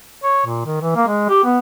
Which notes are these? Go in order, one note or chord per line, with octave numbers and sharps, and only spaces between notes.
C#5
A#2
D#3
E3
A#3
G#3
G4
B3